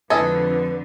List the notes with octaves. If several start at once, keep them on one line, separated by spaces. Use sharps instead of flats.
F2 D3 G#3 E4 A4 B4 D#5 G#5